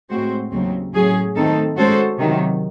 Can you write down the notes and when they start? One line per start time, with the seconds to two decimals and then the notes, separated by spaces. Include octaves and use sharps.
0.10 A2 G#3 C4 F#4 C5
0.52 D#2 C#3 F#3 C4
0.94 A2 F#3 C#4 G#4
1.36 D#3 A3 C4 D#4 A4
1.77 G#3 C#4 F#4 A4 C5
2.19 C3 D#3 F#3